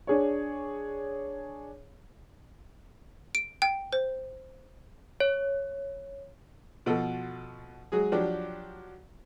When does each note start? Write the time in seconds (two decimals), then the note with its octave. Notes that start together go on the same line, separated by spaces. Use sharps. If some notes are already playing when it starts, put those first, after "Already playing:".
0.07 D4 G#4 C#5
3.35 D7
3.62 G5
3.93 C5
5.20 C#5
6.86 B2 F3 F#4 A4
7.92 F#3 G#3 G#4
8.12 F3 F#3 D4 G4